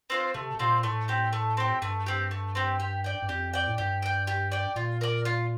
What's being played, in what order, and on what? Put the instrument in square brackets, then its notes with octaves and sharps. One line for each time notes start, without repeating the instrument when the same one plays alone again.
[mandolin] C4 F4 C5
[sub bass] C3 [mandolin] A3
[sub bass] C3
[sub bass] A#2 [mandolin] C4 F4 C5
[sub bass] A2 [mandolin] A3
[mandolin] C4 G4
A3
C4 G4
[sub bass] G2 [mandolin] A3
[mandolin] C4 G4
A3
C4 G4
G4
D5 G5
[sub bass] G2
[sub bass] F2 [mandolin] G4
[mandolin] D5 G5
[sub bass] A2
[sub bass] G2 [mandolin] G4
[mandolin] D5 G5
G4
D5 G5
[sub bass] A#2 [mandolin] F4
[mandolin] A#4 D5
F4